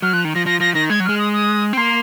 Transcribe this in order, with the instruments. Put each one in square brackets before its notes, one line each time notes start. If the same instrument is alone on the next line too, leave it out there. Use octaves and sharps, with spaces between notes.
[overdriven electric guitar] F#3 [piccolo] F6
[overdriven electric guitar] F3 [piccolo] F#6
[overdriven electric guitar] D#3
[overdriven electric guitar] F3 [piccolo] A#6
[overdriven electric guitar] F3 [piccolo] A#6
[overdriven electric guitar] F3 [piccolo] A#6
[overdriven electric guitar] D#3 [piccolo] A#6
[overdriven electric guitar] G#3 [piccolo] G#6
[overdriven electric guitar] F#3
[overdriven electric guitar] G#3 [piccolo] F6
[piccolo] D#6
D#6
[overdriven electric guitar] C4
[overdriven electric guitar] A#3 [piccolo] C6